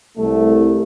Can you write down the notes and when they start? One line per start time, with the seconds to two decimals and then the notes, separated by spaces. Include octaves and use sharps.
0.18 C2 A3